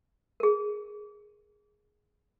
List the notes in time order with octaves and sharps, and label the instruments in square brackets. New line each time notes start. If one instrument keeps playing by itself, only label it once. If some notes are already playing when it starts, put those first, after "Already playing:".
[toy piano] G#4 A#4